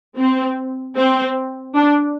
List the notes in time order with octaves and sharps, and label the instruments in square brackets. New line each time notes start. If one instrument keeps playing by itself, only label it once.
[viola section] C4
C4
D4